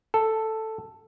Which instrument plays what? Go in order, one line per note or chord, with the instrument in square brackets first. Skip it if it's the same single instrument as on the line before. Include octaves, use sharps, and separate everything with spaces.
[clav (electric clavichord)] A4